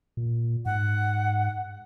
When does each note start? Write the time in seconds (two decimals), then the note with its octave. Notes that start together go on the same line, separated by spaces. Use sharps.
0.17 A#2
0.66 G#2 F#5